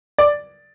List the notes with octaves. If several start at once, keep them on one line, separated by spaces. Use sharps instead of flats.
D5